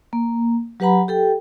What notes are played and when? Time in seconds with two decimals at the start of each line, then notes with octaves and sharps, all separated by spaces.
0.13 A#3
0.80 F#3 G4 B4 F#5 A#5 B5
1.08 G4 A4 G5